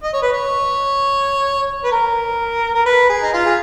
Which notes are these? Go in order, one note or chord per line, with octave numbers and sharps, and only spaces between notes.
D#5
C#5
B4
C#5
B4
A#4
A#4
B4
G#4
D#4
F4
G#4